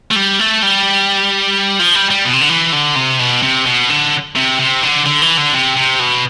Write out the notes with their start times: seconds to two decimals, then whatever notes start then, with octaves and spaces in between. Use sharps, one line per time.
0.11 A3
0.16 G3
0.39 A3
0.62 G3
1.79 F3
1.95 G3
2.10 G3
2.25 B2
2.33 C3
2.41 D3
2.49 E3
2.73 D3
2.96 C3
3.19 B2
3.43 C3
3.66 B2
3.90 D3
4.36 C3
4.60 C3
4.83 D3
5.06 D3
5.22 E3
5.37 D3
5.53 C3
5.76 C3
6.00 B2